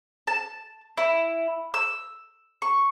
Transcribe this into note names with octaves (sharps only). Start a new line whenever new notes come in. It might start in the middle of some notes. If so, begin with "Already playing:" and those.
A5
E4
E6
C#6